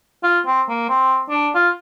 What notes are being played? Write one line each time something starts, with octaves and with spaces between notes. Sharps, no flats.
F4
C4
A#3
C4
D4
F4